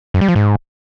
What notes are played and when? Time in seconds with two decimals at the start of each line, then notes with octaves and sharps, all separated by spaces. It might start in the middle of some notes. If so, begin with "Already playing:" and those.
0.14 F#2
0.21 G3
0.28 F3
0.36 G#2